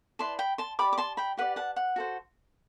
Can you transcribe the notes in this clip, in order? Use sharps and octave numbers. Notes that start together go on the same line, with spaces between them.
E4 B4 D5 A5 C6
G5 B5
A5 C6
G4 D5 B5 D6
D6
A5 C6
G5 B5
G4 B4 D5 F#5
F#5 A5
F#5
F#4 A4 C5